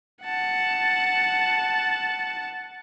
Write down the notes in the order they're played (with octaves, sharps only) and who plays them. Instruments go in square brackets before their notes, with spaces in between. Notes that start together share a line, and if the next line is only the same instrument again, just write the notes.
[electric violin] F#5 A5